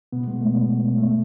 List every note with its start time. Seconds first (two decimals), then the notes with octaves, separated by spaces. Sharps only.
0.12 B2 B3
0.28 G#3
0.41 A3
0.55 B2 B3
0.98 A3